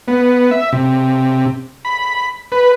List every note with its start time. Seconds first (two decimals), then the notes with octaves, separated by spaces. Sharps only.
0.08 B3
0.51 E5
0.72 C3
1.85 B5
2.52 B4